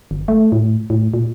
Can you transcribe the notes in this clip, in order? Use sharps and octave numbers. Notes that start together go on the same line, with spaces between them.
G1
A3
A2
A2
A#2